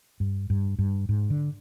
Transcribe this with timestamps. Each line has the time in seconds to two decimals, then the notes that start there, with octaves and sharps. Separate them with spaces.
0.20 G2
0.50 G2
0.79 G2
1.09 G#2
1.30 D3